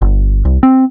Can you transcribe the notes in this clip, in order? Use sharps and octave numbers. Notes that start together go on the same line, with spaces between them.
G1
C2
C4